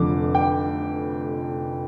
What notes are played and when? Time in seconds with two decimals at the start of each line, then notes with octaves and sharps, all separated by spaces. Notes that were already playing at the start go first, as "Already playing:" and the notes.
Already playing: F1 F2 D3 D6
0.35 G5